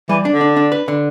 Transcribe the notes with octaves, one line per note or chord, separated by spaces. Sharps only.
E3 G3
D4
D3
D4
D4
B4
D3